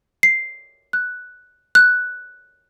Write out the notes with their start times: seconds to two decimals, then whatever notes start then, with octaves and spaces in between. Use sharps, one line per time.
0.23 C7
0.93 F#6
1.75 F#6